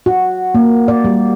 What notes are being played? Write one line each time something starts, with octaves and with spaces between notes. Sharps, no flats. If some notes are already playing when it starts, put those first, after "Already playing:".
F#4
A#3
D5
G3